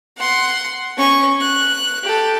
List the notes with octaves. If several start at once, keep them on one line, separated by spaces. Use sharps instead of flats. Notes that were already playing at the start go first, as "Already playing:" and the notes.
F#5 C6
C#4 C#6
F#6
G4 A4